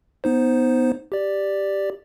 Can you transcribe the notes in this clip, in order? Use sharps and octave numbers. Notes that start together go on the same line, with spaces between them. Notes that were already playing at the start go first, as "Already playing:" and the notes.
B3 D#4 C5
G4 D5